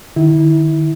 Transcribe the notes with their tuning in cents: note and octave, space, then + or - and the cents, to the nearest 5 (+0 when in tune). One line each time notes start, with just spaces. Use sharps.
D#3 -40 E4 -20